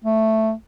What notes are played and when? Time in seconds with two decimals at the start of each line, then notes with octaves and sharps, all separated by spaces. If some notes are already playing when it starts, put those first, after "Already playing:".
0.04 A3